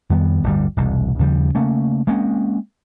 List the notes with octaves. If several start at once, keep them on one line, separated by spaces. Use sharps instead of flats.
F2 D#3 G3 B3
D1 G1 G3
E1 C2
D#2 C#3 F3 G3
C#3 A3 A#3 C#4
G#3 A#3 C4 C#4